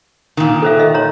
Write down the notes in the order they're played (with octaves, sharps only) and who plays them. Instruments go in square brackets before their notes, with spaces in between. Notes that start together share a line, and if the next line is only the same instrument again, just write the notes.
[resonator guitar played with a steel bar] A#2 D#3
[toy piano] A4 C5 E5
D#5 E5
C#5 A#5 C6